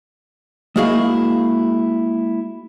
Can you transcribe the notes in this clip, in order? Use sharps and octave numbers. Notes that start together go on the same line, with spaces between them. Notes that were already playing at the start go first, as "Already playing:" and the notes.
G#3 A#3 E4 F#4 G#4 F5